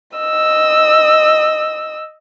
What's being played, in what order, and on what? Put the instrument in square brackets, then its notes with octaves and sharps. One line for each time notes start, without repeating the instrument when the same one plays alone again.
[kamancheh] D#5 E6